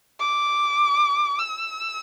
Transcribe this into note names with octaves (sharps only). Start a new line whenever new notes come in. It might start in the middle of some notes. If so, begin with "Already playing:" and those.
D6
E6